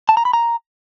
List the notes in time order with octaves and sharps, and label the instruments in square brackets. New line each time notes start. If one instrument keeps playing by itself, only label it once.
[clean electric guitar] A5
A#5
B5
A#5